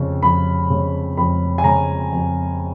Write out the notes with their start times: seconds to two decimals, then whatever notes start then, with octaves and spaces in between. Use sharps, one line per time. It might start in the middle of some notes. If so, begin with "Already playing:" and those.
Already playing: F2 C#3
0.23 F2 B5
0.70 C#3
1.17 F2 B5
1.58 G#5
1.64 C#3 A#5
2.12 F2